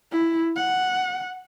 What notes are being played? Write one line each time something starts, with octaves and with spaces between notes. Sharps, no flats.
E4
F#5